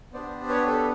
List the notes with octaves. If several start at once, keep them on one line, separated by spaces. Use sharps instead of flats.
B3 D4 G4 C5 D5
B4 C#5
A4 B4